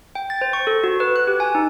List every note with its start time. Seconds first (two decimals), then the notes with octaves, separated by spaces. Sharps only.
0.15 G5
0.30 A6
0.41 C5
0.53 C#6
0.67 A4
0.84 F#4
1.00 B4
1.16 F#6
1.27 G4
1.40 G#5
1.55 D#4